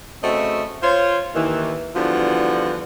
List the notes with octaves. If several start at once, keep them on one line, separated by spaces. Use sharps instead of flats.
C#3 A3 C4 F#4 D#5 E5
F4 C5 C#5
D#2 D#3 E3
D3 E3 F3 G3 B3 F#4